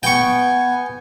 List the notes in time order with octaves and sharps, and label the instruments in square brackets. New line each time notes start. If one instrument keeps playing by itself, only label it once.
[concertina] B3 G#5 [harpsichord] G5 C#6